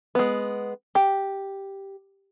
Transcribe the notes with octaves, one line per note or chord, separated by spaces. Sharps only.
G#3 B3
G4